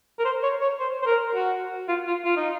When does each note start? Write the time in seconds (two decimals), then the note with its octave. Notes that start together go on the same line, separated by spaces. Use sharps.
0.19 A#4
0.25 C5
0.43 C#5
0.61 C#5
0.79 C5
1.02 C5
1.06 A#4
1.35 F#4
1.89 F4
2.07 F4
2.25 F4
2.37 D#4